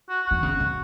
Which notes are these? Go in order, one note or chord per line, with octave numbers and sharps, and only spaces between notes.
F#4
D#3 F#4
C#3
C#3